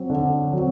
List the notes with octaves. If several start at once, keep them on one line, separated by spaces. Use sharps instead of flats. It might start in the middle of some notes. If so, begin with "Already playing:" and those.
Already playing: F#3 C4
D3
F#3 C4